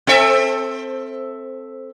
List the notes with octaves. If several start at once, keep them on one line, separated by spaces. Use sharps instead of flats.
C4 A4 E5